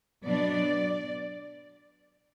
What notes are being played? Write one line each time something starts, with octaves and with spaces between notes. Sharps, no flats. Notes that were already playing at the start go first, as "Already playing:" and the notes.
B2 F#3 B3 D4 D5